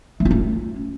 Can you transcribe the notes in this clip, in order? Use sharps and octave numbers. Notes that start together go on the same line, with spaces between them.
A3
F4
C#4